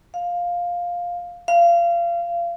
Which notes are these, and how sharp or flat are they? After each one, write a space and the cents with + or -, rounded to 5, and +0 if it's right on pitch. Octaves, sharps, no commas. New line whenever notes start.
F5 +5
F5 -30